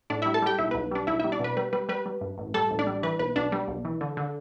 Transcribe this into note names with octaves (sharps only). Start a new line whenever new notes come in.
A2 D4 D5
G3 E4 E5
A4 A5
G3 G4 G5
B1 E4 E5
B1 B4
G3 D4 D5
B1 E4 E5
E4 E5
G3
D4 D5
B2 B4
G3 B4
G3 B4
G3 B4
G3
G2
A1
G3 A4 A5
A1
D4 D5
G3
E3 B4
B1 B4
B1 D4 D5
G3
B1
E3
D3
D3